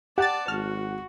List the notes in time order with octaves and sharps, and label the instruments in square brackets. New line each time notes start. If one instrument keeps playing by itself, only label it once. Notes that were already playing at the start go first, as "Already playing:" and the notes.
[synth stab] G4 A6 [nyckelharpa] D5 A5 [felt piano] F#5
[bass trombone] G#1 [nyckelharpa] F#4 [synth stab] F6